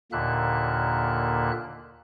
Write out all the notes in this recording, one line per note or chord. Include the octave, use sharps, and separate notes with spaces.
D#2 A#2 D3 A#3 E5 F#6